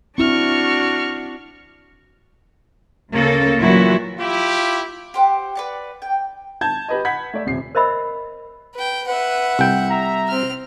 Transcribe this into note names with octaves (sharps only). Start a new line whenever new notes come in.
C4 D4 E4 F#4 C#6 F6
D2 C#3 A#3 A4
A#2 E3 F#3 E4 F#4
E4 F4 G4
G4 C5 F#5
B4 D5 F#5
G5
A5 G6 G#6
G4 B4 D#5
F#5 B5 G6 G#6 B6
A3 D5 E5
D#1 C3 C7
A#4 C5 D#5 E5 B5 E6
B4 G5
B4 E5 F#5
C2 G5
E5 A#5
C4 F6